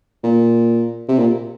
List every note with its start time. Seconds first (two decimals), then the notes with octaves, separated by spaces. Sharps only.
0.24 A#2
1.09 C3
1.19 A#2